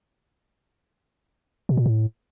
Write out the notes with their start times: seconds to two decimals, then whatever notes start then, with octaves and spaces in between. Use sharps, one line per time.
1.69 B2
1.77 A#2
1.86 A2